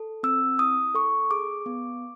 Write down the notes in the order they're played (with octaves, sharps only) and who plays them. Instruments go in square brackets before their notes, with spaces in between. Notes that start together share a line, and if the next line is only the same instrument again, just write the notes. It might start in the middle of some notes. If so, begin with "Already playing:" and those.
Already playing: [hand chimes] A4
C4 E6
E4 D#6
A4 C#6
G#4 D6
B3